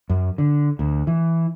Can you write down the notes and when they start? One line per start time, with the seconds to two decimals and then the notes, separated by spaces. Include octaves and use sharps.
0.10 F#2
0.38 D3
0.79 D2
1.07 E3